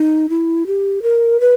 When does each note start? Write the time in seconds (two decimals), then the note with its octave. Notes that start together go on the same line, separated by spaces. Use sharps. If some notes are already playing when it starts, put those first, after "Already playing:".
Already playing: D#4
0.29 E4
0.67 G4
1.03 A#4
1.40 B4